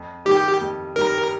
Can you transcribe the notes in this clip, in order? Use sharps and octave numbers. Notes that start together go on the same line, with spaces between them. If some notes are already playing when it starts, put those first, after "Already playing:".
Already playing: F2
D#3 G3 G4
F2
D#3 G3 A#4